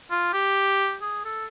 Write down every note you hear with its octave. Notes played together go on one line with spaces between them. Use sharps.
F4
G4
G#4
A4